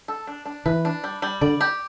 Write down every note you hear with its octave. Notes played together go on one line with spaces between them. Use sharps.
A4
D4
D4
E3 B4
D4
G3
G3
D3 D5
G4